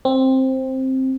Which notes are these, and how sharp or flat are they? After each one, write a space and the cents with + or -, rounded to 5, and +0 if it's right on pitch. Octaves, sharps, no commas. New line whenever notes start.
C4 +10